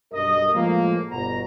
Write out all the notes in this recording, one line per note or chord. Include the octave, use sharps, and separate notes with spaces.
B1 G2 A#4 D#5
A2 F3 G#3 A#3
G1 B2 A#5